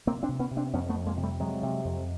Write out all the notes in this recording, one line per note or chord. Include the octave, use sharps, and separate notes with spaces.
C3 A#3 C4
C4 D4
C3
B3 C#4
C3
C4 D4
F2 B3 C#4
A3 B3
F2
G#3 A#3
C3
G3 A3
C3 F#3 G#3
C3
F2